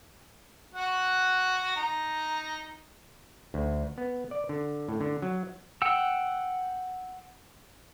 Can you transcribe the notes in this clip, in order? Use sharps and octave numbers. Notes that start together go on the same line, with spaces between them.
F#4 F#5
D#4 A#5
D2
B3
D5
D3
A2
D3
F#3
F#5 G5 E6